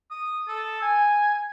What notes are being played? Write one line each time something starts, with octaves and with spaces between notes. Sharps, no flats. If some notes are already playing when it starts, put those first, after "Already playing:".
D#6
A4
G#5